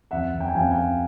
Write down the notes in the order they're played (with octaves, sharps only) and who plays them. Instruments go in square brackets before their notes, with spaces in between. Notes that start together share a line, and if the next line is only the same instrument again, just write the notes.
[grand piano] F2 E5 F#5
F2
G5
G#5
F2 F5 G5
F5 G5
F2